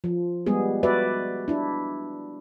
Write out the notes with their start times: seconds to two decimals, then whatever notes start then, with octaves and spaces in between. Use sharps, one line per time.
0.04 F3
0.46 G3 G#3 B3 G#4
0.83 F#4 B4 D5 E5
1.48 D4 E4